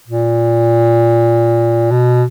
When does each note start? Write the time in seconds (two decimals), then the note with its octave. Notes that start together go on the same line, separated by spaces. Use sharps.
0.08 A#2
1.92 B2